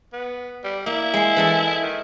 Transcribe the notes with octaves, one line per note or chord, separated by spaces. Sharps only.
B3
G3
A#3 E4
G#3 C6
E3 G#3 A4
D#3